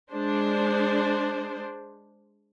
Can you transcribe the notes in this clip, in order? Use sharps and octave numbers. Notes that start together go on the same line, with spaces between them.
G#3 D4 C5